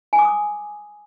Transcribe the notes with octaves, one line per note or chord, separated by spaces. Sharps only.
G#5
D6
D#6